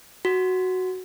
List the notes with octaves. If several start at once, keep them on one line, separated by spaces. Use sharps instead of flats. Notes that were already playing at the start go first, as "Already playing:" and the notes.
F#4